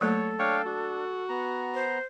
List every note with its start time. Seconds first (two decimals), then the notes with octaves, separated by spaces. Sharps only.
0.01 F#3 A3 A#3 A4 C#5
0.39 D4 C#5 F5 G5
0.66 D4 F#4
1.29 B3 A#5
1.74 C5